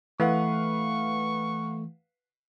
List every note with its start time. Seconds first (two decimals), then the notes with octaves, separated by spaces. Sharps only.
0.20 E3 A3 B4 F5 F#5 C#6